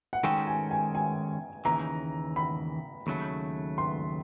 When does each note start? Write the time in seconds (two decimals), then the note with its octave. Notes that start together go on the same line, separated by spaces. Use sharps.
0.13 F#5
0.24 D#3 G#3 C#4 F#4 A4 G5
0.47 G#5
0.71 G#5
0.95 G#5
1.65 D#2 C#3 E3 A#5
2.36 B5
3.07 D#2 C#3 F#3 A3
3.78 C6